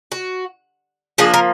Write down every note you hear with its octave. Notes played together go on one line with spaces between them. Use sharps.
F#4
F3 A#3 D4 G#4
A#4